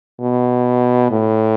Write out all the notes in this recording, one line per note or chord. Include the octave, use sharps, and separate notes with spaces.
B2
A2